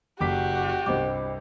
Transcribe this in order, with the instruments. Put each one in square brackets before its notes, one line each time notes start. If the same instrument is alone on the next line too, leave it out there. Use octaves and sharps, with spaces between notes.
[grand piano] F#1 D6 B6 [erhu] F#4 [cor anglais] G4
[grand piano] C2 G2 [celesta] C5 D#5 D6